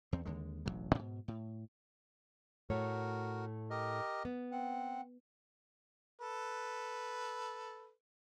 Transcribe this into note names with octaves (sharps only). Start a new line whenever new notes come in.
E2 C4
D#2 D3 G#3
E1 A1 F#2 F#3
G#2 B2
A2
A2 A3 F#4 A#4 C#5
G4 A#4 D#5
B3
C4 F#5
A4 B4